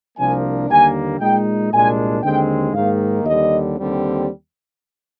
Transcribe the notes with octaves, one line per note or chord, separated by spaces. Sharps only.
C2 C3 F3 A#3 D4 G#5
D#2 D3 G3 A#3 G#5
A#2 G#3 D#4 G5
C2 A#2 G#3 D4 G#5
D#2 D3 G#3 C4 G5
G#2 D#3 A#3 F5
D#2 D3 G3 D#5
D#2 D3 G3 C4